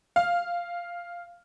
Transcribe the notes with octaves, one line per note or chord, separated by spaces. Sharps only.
F5